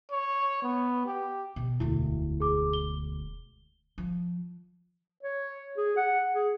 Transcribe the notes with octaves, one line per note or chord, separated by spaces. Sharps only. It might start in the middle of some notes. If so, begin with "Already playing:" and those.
C#5
B3
G4
B2
E1 D2 E4
G#4 D6
G7
F3
C#5
G#4
F#5
G#4